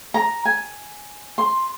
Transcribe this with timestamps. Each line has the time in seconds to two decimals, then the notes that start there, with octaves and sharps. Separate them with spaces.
0.14 A#5
0.45 G#5
1.38 C6